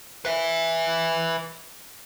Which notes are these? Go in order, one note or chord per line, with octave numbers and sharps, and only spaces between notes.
B4 E5